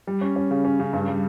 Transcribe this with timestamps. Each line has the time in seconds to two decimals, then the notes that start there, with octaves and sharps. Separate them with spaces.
0.07 G3
0.21 C#4
0.36 C#4
0.51 C#3
0.65 C#4
0.80 C#3
0.93 G2
1.08 G3